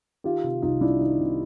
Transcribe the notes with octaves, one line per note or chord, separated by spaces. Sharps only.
D#3 F4 G4
C3
C2 D#4 F4
G3 D4 E4
D#3 D#4
C3